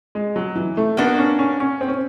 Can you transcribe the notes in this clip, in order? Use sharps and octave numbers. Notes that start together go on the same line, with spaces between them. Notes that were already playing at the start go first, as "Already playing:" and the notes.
G#3
F#3
E3
A3
A#3 B3 D4 F#4
C#4
C#4
C#4
C4
C#4